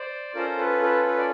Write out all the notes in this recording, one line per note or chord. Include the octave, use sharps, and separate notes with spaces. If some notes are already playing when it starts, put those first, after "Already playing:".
Already playing: C5 D5
C#4 F4 A4 A#4 C5
A4 B4
A4 B4
A4 B4
D5